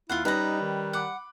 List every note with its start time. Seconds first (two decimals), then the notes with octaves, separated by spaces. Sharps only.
0.09 D#2 E4 F4 F5 F#5
0.25 G3 C#4 D#4 B4 D#5 A#5 F#6
0.61 D#3
0.93 F#5 B5 D6 F#6